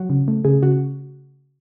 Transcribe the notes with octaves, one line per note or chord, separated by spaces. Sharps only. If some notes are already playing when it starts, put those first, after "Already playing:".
Already playing: F#3 F#4
C#3
A3
C#3 G#4
C#3 F#4